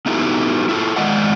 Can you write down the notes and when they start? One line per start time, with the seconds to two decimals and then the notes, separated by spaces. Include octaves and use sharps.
0.06 B3 D#4 E4 F#4 G4 A4
0.69 E4 F4 A4
0.96 D#3 G#3 D5 D#5 F#5